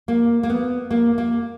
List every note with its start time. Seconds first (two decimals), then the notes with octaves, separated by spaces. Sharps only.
0.08 A#3
0.43 A#3
0.50 B3
0.91 A#3
1.18 A#3